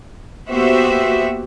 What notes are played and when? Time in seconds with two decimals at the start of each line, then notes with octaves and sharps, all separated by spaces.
0.47 A#3 B3 F#4 G4 C5 E5